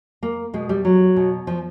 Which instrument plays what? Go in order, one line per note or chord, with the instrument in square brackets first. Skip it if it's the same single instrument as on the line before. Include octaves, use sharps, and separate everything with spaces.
[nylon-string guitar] A#3
B2 G#3
G3
F#3
B2
F3